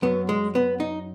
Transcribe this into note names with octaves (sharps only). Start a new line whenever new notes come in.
F#2 F#3 B3
G#3
B3
D#4